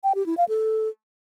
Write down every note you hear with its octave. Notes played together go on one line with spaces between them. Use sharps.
G5
G4
E4
F5
A4